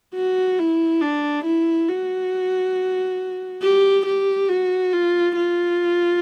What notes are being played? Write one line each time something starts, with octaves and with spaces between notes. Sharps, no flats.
F#4
E4
D4
E4
F#4
G4
G4
F#4
F4
F4